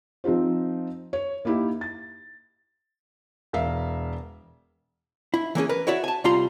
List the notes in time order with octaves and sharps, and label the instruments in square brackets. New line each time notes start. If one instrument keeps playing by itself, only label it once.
[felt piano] F3 C4 D#4 F4 C5
C#5
A#3 D#4 E4 G4
A6
E1 A#4 E5 F5
[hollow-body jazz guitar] E4
E3 A#3 C#4 G#4
A#4 B4
E4 F#4 C#5 D5 E5
G#5 A5
C2 G3 F4 A#5 C6